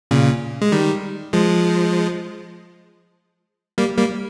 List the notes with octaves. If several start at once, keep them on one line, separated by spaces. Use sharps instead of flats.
A#2 C#3
G#3
D#3 G3
F3 G#3
G3 A#3
G3 A#3